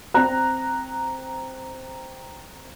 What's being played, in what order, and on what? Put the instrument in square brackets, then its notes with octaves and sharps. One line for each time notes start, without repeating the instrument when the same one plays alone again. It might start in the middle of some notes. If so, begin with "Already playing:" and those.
[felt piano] C4 A#5 F#6